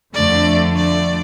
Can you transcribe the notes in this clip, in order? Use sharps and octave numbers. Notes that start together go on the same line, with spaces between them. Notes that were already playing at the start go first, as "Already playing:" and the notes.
F2 D3 F3 A3 D5
D5